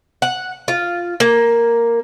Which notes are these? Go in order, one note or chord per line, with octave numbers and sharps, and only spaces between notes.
F#5
F4
A#3